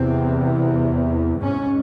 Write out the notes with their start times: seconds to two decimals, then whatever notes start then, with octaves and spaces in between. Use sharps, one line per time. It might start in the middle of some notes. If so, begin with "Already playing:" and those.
Already playing: E2 C3 C4
1.43 G#2 C#4